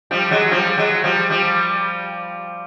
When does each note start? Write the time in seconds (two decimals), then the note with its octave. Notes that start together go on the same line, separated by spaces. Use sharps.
0.11 F3 G3
0.31 F#3 G#3
0.51 F3 G3
0.77 F#3 G#3
1.04 F3 G3
1.30 F3 G3